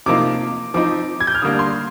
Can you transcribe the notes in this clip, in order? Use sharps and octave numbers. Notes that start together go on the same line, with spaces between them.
C3 F3 A#3 D#4 D6
F3 C4 D#4 D6
G#6
G6
F6
D3 G3 A#3 D4 D#6
C6